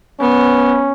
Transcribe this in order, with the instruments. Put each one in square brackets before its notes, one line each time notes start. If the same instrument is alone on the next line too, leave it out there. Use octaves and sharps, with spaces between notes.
[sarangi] B3 [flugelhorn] C#4